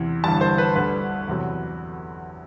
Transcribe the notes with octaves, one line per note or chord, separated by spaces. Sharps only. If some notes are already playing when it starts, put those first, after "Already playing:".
Already playing: E2 C3 E3
G1 G2 E3 G3 A5
C5
B4
D2 D3 G3 B4
E2 C3 F#3